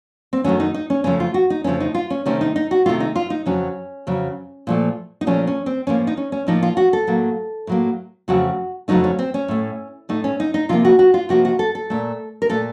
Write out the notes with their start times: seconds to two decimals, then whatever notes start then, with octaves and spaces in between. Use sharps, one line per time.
0.33 C4
0.44 F#2 D#3 F#3 A3 C#4
0.60 D#4
0.74 D#4
0.90 C#4
1.04 F2 C#3 F3 A3 C#4
1.20 F4
1.34 F#4
1.50 D#4
1.64 F2 C#3 F3 A3 C#4
1.80 D#4
1.95 F4
2.10 C#4
2.26 C3 D#3 A3 C#4
2.41 D#4
2.56 D#4
2.71 F#4
2.86 C3 D#3 A3 F4
3.00 D#4
3.16 F4
3.30 D#4
3.46 F2 C#3 F#3 C#4
4.07 F2 C#3 F#3
4.67 A#2 F3 A3
5.21 D#4
5.27 A#2 F3 A3 C#4
5.47 C#4
5.66 C4
5.87 A2 F3 A#3 C#4
6.07 D#4
6.17 C#4
6.32 C#4
6.47 A2 F3 A#3 D#4
6.63 F4
6.77 F#4
6.93 A4
7.07 A2 F#3 A#3
7.67 A2 F#3 A#3
8.28 F2 C#3 F#3 A3 F#4
8.88 F2 C#3 F#3 A3 D#4
9.04 C#4
9.19 C4
9.34 C#4
9.48 A2 A3
10.09 A2 A3 D#4
10.24 C#4
10.40 D#4
10.54 D#4
10.69 C3 F3 A#3 F4
10.85 F#4
10.99 F#4
11.14 F4
11.29 C3 F3 A#3 F#4
11.45 F#4
11.59 A4
11.75 A4
11.90 A#2 A3
12.42 A#4
12.50 A#2 A3 A4